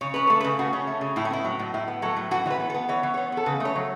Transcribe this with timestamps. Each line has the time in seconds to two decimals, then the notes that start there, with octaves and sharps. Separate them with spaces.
0.01 C#3 C#5
0.14 C#4 B4
0.27 A3 A4
0.41 B4
0.44 C#3
0.59 C#3 F#4
0.73 C#4
0.87 A3
1.01 C#3
1.16 A2 E4
1.25 C#4
1.30 B3 E4
1.45 F#3
1.59 A2
1.74 A2 E4
1.88 B3
2.02 F#3 A4
2.17 A2
2.31 E3 F#4
2.45 E3 C#5
2.50 B4
2.60 B3
2.70 A4
2.74 B3
2.89 E3 C#5
3.03 E3
3.14 B3 C#5
3.32 B3 A4
3.46 C#3 B4
3.60 A3 C#5
3.75 F#3